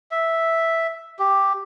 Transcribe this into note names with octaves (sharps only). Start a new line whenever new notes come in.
E5
G4